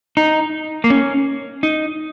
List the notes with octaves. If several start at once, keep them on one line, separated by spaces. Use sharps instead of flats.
D#4
A#3
C#4
D#4